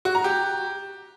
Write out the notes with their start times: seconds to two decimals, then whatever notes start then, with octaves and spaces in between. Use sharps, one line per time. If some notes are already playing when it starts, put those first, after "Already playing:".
0.05 F#4
0.15 A#5
0.24 G4